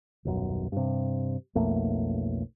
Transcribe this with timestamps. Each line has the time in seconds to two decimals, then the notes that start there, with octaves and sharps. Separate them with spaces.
0.25 D#1 B1 F#2
0.72 G2 C3
1.55 B1 F2 A3 A#3